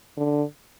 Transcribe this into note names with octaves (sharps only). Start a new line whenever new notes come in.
D3